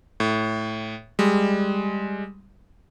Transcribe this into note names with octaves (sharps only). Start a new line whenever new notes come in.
A2
G3 G#3